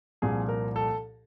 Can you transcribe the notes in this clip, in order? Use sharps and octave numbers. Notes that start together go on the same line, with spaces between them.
C2 A#2 F3 G#4
A#4
A4